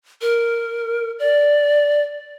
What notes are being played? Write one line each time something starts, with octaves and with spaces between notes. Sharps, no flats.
A#4
D5